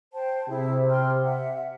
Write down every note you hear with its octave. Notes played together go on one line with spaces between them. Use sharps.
C5 G5 A5
C3 E4 G#4
G5 C6 F6
E5 F#5